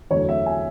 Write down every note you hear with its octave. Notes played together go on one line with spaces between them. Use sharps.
E2 D3 F#3 A3 C#5
E5
G#5